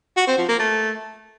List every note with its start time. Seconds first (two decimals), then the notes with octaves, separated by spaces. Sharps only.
0.17 F#4
0.27 C4
0.38 F3
0.49 A#3
0.59 A3